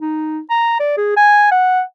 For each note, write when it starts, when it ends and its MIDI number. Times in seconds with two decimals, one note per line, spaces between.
0.01 0.40 63
0.50 0.77 82
0.80 0.97 74
0.97 1.14 68
1.17 1.49 80
1.52 1.82 78